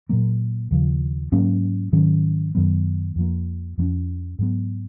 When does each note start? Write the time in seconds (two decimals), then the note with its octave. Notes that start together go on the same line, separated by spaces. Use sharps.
0.09 A#2 F#3 A#3
0.71 D#2 C#3 F3
1.32 G#2 F#3 A#3 C#4
1.92 G#2 D#3 F#3 C#4
2.55 F#2 D#3 F#3 B3
3.16 F2 F3 A#3
3.78 F2 F3 A#3 C#4
4.39 G#2 F#3 B3